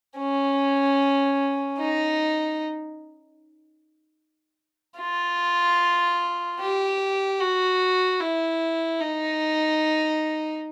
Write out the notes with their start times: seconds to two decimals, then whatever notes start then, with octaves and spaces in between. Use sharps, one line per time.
0.17 C#4
1.78 D#4
4.99 F4
6.60 G4
7.40 F#4
8.21 E4
9.00 D#4